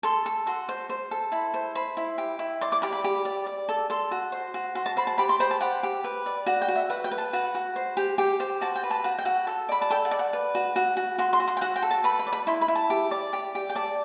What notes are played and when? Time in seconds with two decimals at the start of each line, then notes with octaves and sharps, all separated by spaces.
0.03 A4 C6
0.26 A4
0.47 F#4 C6
0.69 C5
0.89 C5
1.11 A4
1.32 E4 B5
1.54 C5
1.75 C5 B5
1.97 E4
2.18 G4
2.39 E4
2.61 D5 C6
2.72 D6
2.82 G4 B5
2.93 B5
3.04 G4
3.25 D5
3.46 D5
3.69 A4
3.90 A4 C6
4.11 F#4
4.32 C5
4.54 F#4
4.75 F#4 C6
4.86 A5
4.97 C5 B5
5.07 A5
5.18 G4 B5
5.29 C6
5.40 C5 B5
5.51 A5
5.61 G4 F#5
5.83 G4
6.04 B4
6.26 D5
6.46 F#4 F#5
6.62 G5
6.68 F#4
6.76 E5
6.90 B4 F#5
7.04 G5
7.11 B4
7.18 A5
7.33 F#4 F#5
7.55 F#4
7.76 C5
7.97 G4
8.18 G4 G5
8.40 C5
8.61 F#4 A5
8.75 G5
8.83 B4
8.91 A5
9.04 F#4 F#5
9.19 G5
9.25 F#4 F#5
9.47 A4
9.69 D5 B5
9.82 A5
9.90 A4 G5
10.05 F#5
10.11 D5
10.19 F#5
10.33 B4
10.55 F#4
10.76 F#4
10.97 F#4
11.18 F#4 C6
11.33 C6
11.40 F#4
11.48 C6
11.57 G5
11.61 F#4 F#5
11.76 G5
11.82 A4
11.91 A5
12.04 B4 B5
12.19 B5
12.27 D5
12.32 B5
12.47 E4 C6
12.61 B5
12.68 E4
12.75 A5
12.90 G4
13.11 D5
13.33 G4
13.55 G4
13.69 G5
13.75 D5 A5